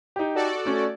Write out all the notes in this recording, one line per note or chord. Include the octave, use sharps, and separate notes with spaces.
D#4 G4
F#4 A4 D5
A3 C#4